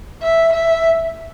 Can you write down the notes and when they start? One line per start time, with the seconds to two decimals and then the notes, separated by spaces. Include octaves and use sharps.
0.22 E5
0.52 E5